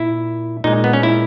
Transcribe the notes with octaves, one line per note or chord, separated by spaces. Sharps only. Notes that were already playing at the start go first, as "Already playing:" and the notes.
Already playing: A#2 E4
A#2 G#3 D#4
B3
C#4
E4